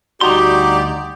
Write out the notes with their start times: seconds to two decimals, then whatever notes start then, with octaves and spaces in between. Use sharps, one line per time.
0.21 D2 G3 D#4 F#4 G4 D5 A#5 C6